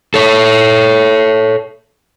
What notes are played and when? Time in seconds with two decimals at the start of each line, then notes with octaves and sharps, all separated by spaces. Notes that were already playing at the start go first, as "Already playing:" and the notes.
0.14 A4 C#5